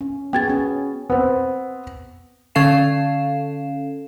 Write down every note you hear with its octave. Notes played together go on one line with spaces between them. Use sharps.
C#4
B3 F#4 G#4 G5 G#6 A6
B3 C#4
B3 C4
D3 C#4 A4 F5 C7 E7